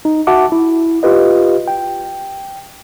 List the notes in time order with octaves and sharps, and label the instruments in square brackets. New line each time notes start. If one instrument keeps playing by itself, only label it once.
[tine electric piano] D#4
F#4 E5 F#5 A5 D6
E4
F4 G4 B4 D#5
G5